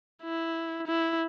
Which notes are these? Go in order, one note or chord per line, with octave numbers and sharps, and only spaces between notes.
E4
E4